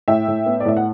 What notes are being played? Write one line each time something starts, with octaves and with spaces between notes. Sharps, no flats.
A2 E5 G5
A2
B3
D5
A2 E5
F#5